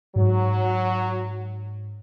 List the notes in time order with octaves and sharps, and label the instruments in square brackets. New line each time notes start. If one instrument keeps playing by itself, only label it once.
[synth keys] G#2 [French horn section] F#3